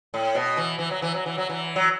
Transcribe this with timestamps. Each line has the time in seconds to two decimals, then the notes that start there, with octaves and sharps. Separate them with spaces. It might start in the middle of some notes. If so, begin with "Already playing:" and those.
0.14 A2
0.35 B2
0.57 E3
0.79 E3
0.91 F#3
1.02 E3
1.14 F#3
1.26 E3
1.38 F#3
1.50 E3
1.76 F#3